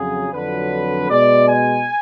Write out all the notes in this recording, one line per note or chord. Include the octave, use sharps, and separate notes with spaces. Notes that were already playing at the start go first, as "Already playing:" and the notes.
Already playing: F2 C#3 F#3 G#4
F2 D3 F#3 B4
B2 G#3 D5
G#5